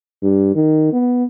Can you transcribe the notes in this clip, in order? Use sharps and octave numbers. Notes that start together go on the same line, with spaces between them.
G2
D#3
B3